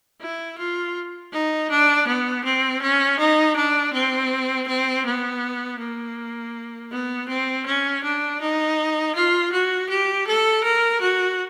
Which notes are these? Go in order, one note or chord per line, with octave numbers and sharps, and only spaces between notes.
E4
F4
D#4
D4
B3
C4
C#4
D#4
D4
C4
C4
B3
A#3
B3
C4
C#4
D4
D#4
F4
F#4
G4
A4
A#4
F#4